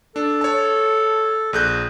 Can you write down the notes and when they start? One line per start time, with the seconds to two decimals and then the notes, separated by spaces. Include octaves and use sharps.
0.16 D4 A4
0.41 C#5 A5
1.53 A#1 G#4 F#6 G6